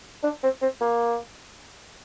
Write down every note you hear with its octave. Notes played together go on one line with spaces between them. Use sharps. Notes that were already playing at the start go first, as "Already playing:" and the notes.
D4
C4
C4
A#3